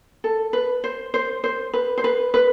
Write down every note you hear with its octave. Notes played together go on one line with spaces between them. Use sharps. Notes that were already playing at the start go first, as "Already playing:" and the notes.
A4
B4
C5
C5
C5
B4
C5
B4
B4